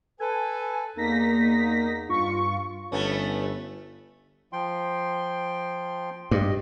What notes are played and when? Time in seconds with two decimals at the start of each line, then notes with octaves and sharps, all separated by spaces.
0.20 A4 B4 G#5
0.97 E2 A#3 D#4 A#6 B6
2.09 G2 F4 C#6
2.92 G1 A3 B3 C#4
4.53 F3 G5 C6
6.31 G2 D#5